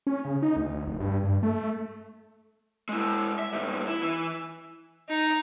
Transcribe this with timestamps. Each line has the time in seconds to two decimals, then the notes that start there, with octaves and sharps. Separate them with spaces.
0.07 C#4
0.25 C#3
0.42 D#4
0.56 D2
0.86 F1
1.00 G2
1.24 G2
1.43 A3
2.89 G#3 E4
3.39 E5
3.53 G2 D#3
3.87 E4
4.02 E3
5.09 D#4